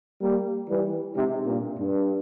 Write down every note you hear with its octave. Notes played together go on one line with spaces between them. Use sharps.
G3 A#3
E3 G3
G#2 C3
G2 A#2
G2